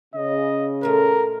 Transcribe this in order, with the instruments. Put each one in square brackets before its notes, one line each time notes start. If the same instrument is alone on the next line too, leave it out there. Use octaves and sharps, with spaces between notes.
[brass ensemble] C#3 [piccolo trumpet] D#5
[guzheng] A#2 A3 [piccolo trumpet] A#4